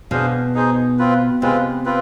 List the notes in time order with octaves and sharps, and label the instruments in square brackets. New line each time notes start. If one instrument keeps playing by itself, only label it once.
[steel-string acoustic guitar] B2 [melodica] D4 G#4 C5 F5
[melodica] D#4 G#4 C5
C4 F4 B4
[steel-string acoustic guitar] C3 [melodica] G#3 C4 F4 B4
[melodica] C4 F4 B4